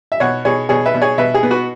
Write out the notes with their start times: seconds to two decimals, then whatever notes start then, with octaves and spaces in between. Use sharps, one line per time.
0.12 E5
0.20 B2 C#5 F#5
0.45 B2 G#4 C#5
0.69 B2 G#4 C#5
0.86 B4 E5
0.94 B2
1.02 G#4 C#5
1.18 B2 B4 E5
1.34 G#4
1.43 B3
1.51 F#4 B4